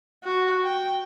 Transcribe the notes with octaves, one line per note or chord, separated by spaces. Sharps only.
F#4
G5